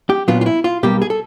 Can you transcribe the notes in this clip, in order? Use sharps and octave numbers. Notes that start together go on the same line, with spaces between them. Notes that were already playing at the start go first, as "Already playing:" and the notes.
G4
A#2 F#3 B3 D4 F4
F4
E4
F4
B1 B2 G3 A#3 G4
G#4
A4